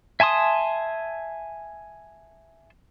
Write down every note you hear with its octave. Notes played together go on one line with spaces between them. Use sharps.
E5 G#5 A5 C6 D#6